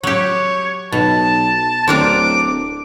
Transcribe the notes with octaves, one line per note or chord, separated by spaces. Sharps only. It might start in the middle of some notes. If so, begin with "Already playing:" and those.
F#3 G4 C#5
B1 B2 A5
D1 C4 D4 A#4 D6